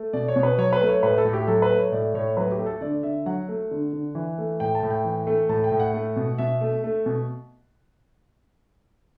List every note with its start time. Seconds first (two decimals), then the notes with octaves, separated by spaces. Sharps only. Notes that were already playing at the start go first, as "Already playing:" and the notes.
Already playing: A3
0.13 B2 D5
0.28 C#5
0.36 B2
0.43 B4
0.58 F#3 C#5
0.73 B4
0.81 A3
0.89 C#5
1.03 A2 B4
1.18 A4
1.25 A2
1.33 G4
1.47 F#3 A4
1.62 B4
1.70 A3
1.77 C#5
1.92 A2 D5
2.14 A2 C#5
2.37 F#3 B4
2.52 G4
2.59 A3
2.66 A4
2.81 D3 D5
3.03 D3 E5
3.26 F#3 F#5
3.49 A3
3.71 D3
3.93 D3
4.15 E3
4.38 A3
4.60 A2 G5
4.75 A5
4.83 A2
4.90 G5
5.05 E3
5.27 A3
5.49 A2 A5
5.64 G5
5.72 A2
5.80 F#5
5.94 A3
6.16 B2
6.38 B2 E5
6.61 A3
6.84 A3
7.06 B2